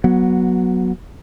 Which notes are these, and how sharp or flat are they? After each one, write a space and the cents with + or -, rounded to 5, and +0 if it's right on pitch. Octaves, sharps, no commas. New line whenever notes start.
F#3 +0 B3 -25